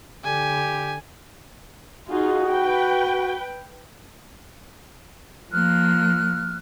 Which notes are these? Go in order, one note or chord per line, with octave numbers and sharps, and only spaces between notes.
D3 G4 G#5
D#4 F4 F#4 G#4
B4 G5
F3 A#3 F6 F#6